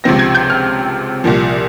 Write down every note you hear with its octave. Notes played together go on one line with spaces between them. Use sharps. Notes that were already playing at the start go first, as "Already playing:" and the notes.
C#2 C3 F3 C4 A#6
G#6
G6
F6
C2 A#2 F3